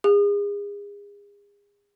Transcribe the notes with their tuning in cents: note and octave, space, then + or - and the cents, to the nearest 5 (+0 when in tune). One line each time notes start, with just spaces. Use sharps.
G#4 -35